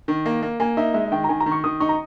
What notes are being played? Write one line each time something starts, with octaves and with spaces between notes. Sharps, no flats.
D#3
A#3
A#3
A#3 G#5
D#4 E5
G#3 E5
E5
D#3 G5
A#5
D#3 G#5
A#5
D#3
C#6
D#3 D#6
D#4 C#6
A#5